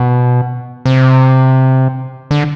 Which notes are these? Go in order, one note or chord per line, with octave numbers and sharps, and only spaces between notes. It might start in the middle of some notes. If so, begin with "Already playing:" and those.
Already playing: B2
C3
D3